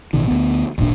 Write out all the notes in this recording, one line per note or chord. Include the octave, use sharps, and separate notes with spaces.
A1 B2 D#3
D2 B3
D#1 G#1 A#2 D4